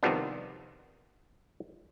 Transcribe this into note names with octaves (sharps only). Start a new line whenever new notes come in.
C3 D#3 F3 G3 B3 D4